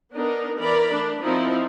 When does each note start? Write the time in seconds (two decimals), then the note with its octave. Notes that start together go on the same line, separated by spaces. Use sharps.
0.14 B3 D4 D#4 A#4
0.58 E3 A#4 D5 B5
0.94 A3 D4
1.24 F3 C4 D#4 E4